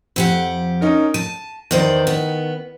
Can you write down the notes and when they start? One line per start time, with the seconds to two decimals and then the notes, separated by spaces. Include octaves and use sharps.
0.16 F2 G4 F#5
0.81 C#4 D#4 A#4
1.14 A5 D#7
1.71 E2 D#3 C5 D5
2.07 B3